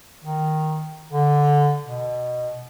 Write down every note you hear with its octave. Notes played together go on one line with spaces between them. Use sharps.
D#3
D3
B2